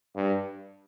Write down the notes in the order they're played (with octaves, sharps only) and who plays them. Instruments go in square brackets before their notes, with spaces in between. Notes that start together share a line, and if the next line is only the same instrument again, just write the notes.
[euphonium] G2